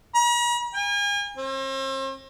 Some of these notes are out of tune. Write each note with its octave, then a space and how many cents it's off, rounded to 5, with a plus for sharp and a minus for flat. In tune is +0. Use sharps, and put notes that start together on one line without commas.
A#5 +45
G#5 -40
C4 +40